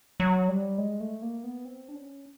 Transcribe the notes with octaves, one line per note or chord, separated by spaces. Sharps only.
F#3
G3
G#3
A3
A#3
B3
C4
D4
C#4